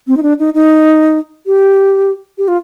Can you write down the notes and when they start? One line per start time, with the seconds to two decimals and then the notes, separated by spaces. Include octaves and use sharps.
0.07 C4
0.17 D#4
0.23 D4
0.39 D#4
0.54 D#4
1.47 G4
2.38 G4
2.48 F4